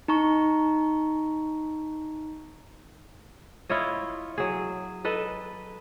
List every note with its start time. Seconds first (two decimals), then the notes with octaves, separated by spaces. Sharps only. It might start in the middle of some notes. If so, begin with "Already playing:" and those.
0.08 D#4 A#5 C#6
3.69 E4 F4 C#5 D#5
4.38 F#3 G#4
5.05 A4 B4 D#5